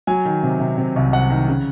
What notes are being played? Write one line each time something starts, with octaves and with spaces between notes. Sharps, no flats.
F#3 G#5
D#3
C3
C3
C3
C2
C2 F#5
D#3
C#3